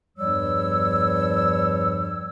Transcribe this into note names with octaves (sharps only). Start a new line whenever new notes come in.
E2 G2 F3 G3 C#5 E6